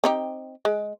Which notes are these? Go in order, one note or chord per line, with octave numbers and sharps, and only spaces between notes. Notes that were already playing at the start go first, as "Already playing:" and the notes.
C4 D#4 G4
G#3